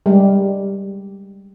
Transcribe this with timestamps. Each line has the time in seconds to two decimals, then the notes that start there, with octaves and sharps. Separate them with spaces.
0.06 G3 G#3